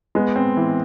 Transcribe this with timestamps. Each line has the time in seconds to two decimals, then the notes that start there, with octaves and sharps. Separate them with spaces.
0.15 G#3 B3
0.36 C4
0.57 E3